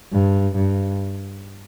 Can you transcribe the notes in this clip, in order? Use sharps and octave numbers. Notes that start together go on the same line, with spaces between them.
G2
G2